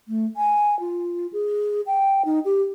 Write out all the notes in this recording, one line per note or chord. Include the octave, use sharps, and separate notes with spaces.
A3
G#5
F4
G#4
G5
D#4
G4